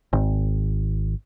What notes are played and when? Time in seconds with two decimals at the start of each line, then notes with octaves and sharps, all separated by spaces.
0.13 G#1